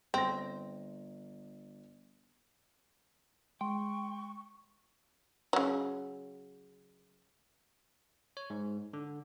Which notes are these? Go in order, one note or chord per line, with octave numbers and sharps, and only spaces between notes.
G1 C4 A#6
G#3 G5 C6 C#6
C#3 F#3
C#5
G#2
D3